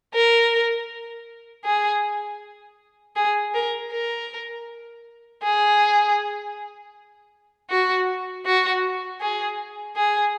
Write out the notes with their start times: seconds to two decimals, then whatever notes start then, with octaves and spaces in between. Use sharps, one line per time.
0.14 A#4
1.65 G#4
3.16 G#4
3.55 A#4
3.92 A#4
5.44 G#4
7.70 F#4
8.46 F#4
9.21 G#4
9.96 G#4